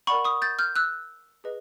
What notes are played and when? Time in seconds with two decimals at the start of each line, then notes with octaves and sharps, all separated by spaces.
0.07 A#4 D5 F#5 B5 C#6
0.25 C#6 D#6
0.42 G6 A6
0.59 F6 G6
0.76 E6 F#6
1.44 G#4 B4 D#5